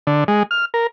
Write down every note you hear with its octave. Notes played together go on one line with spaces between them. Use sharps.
D3
G#3
F6
A#4